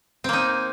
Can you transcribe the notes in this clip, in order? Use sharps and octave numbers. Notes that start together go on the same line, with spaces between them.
A#3 C4 D#4